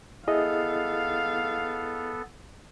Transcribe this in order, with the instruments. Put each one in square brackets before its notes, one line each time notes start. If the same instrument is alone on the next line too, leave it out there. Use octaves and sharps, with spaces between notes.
[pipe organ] B3 A4 [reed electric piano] E4 G#4 D#5 [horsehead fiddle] F5